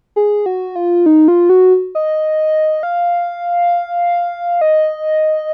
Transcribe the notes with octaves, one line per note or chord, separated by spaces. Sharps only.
G#4
F#4
F4
D#4
F4
F#4
D#5
F5
D#5